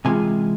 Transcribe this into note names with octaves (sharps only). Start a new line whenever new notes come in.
C3 E3 G#3 F4 G#5